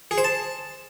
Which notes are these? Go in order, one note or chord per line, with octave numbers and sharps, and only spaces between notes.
G#4
C5
A5